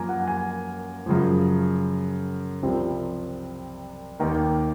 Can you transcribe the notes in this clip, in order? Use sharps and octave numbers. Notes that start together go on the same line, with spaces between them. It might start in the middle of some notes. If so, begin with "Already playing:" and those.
Already playing: F#2 F3 A#3 A#4 G#5
F#5
G#5
F#2 C#3 F3
C2 C3 F3 C4
D#2 D#3 A#3